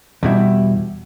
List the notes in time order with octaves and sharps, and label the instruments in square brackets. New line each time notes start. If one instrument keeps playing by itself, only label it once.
[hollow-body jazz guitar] E2 B2 G3 E4